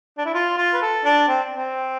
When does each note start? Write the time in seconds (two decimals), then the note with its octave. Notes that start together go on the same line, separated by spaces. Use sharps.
0.18 D4
0.25 E4
0.34 F4
0.57 F4
0.74 B4
0.82 A4
1.05 D4
1.29 C4
1.56 C4